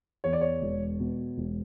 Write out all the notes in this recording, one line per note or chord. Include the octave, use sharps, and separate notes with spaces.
E2 C#5
D5
C#5
E1
B2
E1